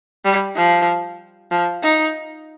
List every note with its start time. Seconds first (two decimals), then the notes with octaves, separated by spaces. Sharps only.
0.25 G3
0.57 F3
1.51 F3
1.83 D#4